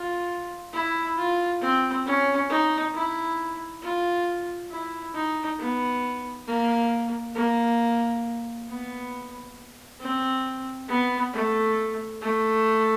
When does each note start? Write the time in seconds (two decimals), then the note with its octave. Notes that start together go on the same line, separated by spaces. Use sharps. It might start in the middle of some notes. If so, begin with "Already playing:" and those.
Already playing: F4
0.73 E4
1.17 F4
1.61 C4
2.06 C#4
2.49 D#4
2.94 E4
3.82 F4
4.70 E4
5.14 D#4
5.59 B3
6.47 A#3
7.36 A#3
8.68 B3
10.01 C4
10.89 B3
11.33 A3
12.22 A3